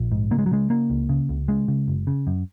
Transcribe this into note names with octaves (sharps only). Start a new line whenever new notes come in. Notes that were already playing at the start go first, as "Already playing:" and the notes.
Already playing: A#1
G#2
C#3 A#3
G#3
F#3
C#3 G#3
C#3 A#3
C#2
C#3
C#2
C#3 G#3
C#3
F#1
C#3
F#2